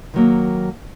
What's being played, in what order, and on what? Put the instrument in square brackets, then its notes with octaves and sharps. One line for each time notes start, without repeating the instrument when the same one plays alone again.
[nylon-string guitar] D#3 F#3 A#3